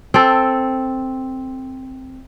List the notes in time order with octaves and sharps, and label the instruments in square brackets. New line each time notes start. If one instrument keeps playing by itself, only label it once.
[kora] C4 A4